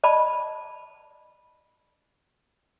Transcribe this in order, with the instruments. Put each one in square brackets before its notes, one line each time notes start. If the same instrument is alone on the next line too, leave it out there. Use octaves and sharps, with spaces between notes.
[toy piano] D5 D#5 A5 B5